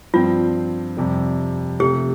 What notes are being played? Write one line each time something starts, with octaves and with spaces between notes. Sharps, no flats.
G2 F3 C4 F4
F2 C3 G3
C3 F3 A3 G4